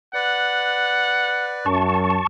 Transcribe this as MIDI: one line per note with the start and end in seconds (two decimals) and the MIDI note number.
0.14 1.67 71
0.14 1.67 74
0.14 1.70 78
1.66 2.19 42
1.66 2.27 81
1.66 2.27 85